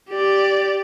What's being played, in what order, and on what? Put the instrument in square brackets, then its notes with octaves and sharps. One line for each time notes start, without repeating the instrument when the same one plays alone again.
[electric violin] G4 D5